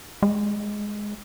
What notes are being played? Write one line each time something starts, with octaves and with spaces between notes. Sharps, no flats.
G#3